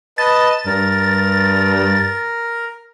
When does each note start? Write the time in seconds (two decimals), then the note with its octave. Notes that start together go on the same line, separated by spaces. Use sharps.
0.18 B4 D#5 A5 A6
0.66 G2 A#4